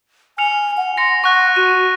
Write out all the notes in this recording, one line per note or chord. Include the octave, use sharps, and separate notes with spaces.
G#5 F6 C#7 F7
F#5
C6 A#6 C#7
F#5 C#6 F#6 A#6
F#4 D#7